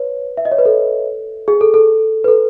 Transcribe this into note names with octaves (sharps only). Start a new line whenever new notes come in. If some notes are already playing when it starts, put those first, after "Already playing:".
Already playing: B4 C#5
E5
D#5
C#5
B4
A4
G#4
A4
A4
B4
A4